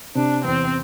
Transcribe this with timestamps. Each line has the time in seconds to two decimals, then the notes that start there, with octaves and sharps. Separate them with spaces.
0.15 C3 D4
0.44 E2 C4